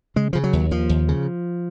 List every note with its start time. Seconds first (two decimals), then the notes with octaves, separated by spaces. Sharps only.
0.16 C#3 G#3
0.33 C#3 F3
0.44 F#3
0.53 D#2
0.71 D#2 F3
0.90 D#2
1.08 C#3